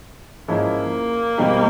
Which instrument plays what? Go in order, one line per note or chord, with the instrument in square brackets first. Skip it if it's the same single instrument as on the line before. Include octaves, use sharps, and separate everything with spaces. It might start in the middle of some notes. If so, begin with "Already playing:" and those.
[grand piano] G#2 F3 G#3 C#4 E4 [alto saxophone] A#3
[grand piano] B2 G3 C4 D#4 G4